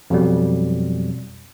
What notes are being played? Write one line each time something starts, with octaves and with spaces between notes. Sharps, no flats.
F2 B2 F#3 G3